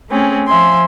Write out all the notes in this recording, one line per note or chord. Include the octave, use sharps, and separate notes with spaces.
A3 C4 C#4 G#4
F3 E5 G#5 C6